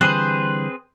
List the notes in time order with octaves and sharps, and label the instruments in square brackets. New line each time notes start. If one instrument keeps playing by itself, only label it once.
[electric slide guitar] D3 E3 G3 [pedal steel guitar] C4 G#4 B4 [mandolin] C5 [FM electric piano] F#6